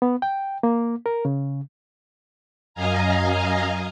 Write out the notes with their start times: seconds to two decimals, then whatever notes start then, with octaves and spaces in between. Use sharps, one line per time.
0.02 B3
0.22 G5
0.63 A#3
1.06 A#4
1.25 C#3
2.74 F#2 D#5 F5 G#5 A#5